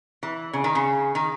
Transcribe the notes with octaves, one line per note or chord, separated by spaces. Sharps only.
E3
C#3
D#3
C#3
D#3